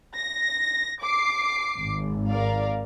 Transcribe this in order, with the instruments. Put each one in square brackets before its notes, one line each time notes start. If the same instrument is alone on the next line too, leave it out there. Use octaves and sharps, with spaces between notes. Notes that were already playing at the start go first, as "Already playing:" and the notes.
[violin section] A#6
D6 C7
[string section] G#1
[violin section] A#4 D5 F5